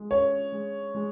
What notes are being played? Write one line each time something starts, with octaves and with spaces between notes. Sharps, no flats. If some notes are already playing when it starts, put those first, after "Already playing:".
Already playing: G#3
C#4 C#5
G#3
G#3